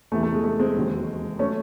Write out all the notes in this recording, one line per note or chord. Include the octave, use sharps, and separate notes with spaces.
E2 C3 E3 A3
A3
G#3
A3
G#3 C4
E1 D#2 D#3 F#3
F#3 A3 C#4